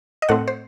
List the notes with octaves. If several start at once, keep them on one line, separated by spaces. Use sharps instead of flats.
D#5
A2 A3 C4 F#5
C5